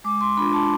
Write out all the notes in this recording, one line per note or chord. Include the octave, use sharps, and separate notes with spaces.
G#3 D6
C6
D4 F4 B5
A5